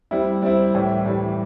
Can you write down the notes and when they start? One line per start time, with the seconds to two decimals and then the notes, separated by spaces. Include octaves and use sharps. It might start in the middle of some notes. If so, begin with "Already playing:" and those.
0.11 G3 C4 E4
0.42 G3 C4 E4
0.74 A2 E3 G3
1.06 A2 E3 G3